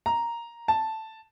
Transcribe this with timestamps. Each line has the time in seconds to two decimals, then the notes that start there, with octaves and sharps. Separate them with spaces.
0.06 A#5
0.68 A5